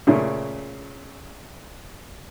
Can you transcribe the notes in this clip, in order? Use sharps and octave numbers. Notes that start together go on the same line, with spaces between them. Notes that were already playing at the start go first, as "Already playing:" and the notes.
A#2 C#3 A3